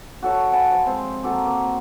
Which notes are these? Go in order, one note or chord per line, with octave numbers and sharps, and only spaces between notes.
F#4 A4 C#5
F#5 G#5 A5 B5
F3
G#3 C4
A#3 F#4 A4
A#3